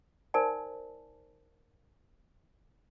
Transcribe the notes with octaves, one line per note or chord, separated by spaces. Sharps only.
D#4 A#4 C5 D5 G#5 A5